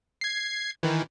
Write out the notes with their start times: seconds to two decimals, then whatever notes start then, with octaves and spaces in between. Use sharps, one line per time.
0.21 G#6 C7
0.83 D#3 E3